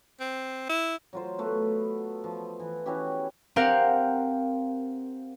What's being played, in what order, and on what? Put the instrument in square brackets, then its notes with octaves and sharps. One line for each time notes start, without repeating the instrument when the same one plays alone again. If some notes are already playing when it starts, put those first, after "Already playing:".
[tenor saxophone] C4
E4
[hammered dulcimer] F#3 F4 C5
A3 B3 B4
F3
E3
C#4 E4 F#4 G4
[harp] C4 G4 A#4 F5 F#5